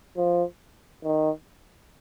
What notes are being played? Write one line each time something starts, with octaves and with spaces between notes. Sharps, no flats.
F3
D#3